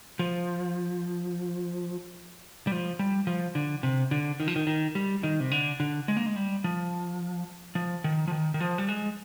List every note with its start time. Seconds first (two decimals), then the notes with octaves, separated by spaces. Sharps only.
0.19 F3
2.67 G3
2.72 F3
2.99 G3
3.27 F3
3.55 D3
3.83 C3
4.11 D3
4.40 D#3
4.48 F3
4.56 D#3
4.67 D#3
4.95 G3
5.23 D#3
5.40 C3
5.51 D3
5.80 D3
6.08 G#3
6.17 A#3
6.26 G#3
6.36 G3
6.64 F3
7.75 F3
8.04 D#3
8.28 F3
8.31 D#3
8.54 D#3
8.60 F3
8.78 G3
8.89 G#3